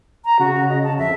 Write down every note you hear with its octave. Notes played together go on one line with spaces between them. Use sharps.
A#5
C#3 F#4
D#5
A5
F2 E5